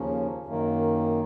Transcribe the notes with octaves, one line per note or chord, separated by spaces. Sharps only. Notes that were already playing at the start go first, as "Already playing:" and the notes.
Already playing: D#2 C#3 F3 A#3 C#4
F#2 D#3 A#3